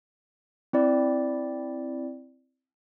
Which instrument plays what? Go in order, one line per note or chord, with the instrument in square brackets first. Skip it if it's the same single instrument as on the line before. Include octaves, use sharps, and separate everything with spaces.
[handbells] C4 E4 D5